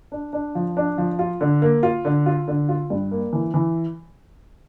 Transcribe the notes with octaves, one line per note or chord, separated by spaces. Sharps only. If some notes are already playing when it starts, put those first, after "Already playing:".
D4
D4
F3
D4
F3
F4
D3
A#3
F4
D3
F4
D3
F4
G2
A#3
E3
E3